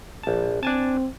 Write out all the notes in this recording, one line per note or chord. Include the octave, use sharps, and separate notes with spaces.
A#1 A5
C4 D4 G#5 A5